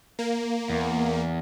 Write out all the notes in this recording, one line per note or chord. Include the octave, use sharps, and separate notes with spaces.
A#3
E2